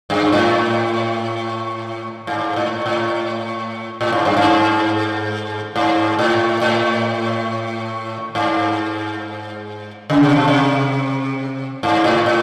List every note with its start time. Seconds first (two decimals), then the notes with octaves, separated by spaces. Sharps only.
0.10 G2
0.32 A2
2.27 G#2
2.56 A2
2.86 A2
4.01 A2
4.12 G#2
4.25 G2
4.37 G#2
5.76 G#2
6.19 A2
6.62 A2
8.35 G#2
10.10 C#3
10.23 C3
10.36 B2
10.48 C3
11.83 G#2
12.04 A2
12.26 A2